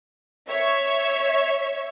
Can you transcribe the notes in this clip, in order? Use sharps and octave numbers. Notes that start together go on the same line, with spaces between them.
C#5 E5